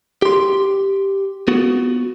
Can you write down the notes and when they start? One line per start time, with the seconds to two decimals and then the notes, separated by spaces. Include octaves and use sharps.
0.22 G4 C6
1.48 B3 F4 F#4